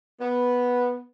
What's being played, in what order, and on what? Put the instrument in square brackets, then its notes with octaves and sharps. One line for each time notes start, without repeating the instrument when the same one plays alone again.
[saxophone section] B3